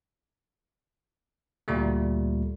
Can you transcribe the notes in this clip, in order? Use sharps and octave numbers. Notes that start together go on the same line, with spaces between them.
D2 A#2 G3 A3